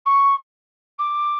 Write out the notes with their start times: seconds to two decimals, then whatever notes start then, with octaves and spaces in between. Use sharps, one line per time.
0.06 C#6
0.98 D6